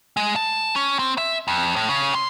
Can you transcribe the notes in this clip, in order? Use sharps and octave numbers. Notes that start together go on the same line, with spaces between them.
G#3
A5
C#4
C4
E5
F2
A2
C#3
C6